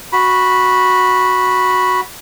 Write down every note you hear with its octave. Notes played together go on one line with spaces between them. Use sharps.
F#4 B5